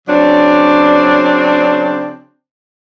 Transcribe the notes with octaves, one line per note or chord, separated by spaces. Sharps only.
C#3 F#3 C4 D4